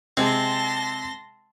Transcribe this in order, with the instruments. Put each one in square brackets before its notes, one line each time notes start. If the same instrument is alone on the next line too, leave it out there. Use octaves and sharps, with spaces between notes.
[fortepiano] C3 G#3 [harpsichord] C4 [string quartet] A5 C6 A#6